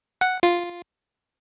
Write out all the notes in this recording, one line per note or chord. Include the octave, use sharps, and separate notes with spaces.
F#5
F4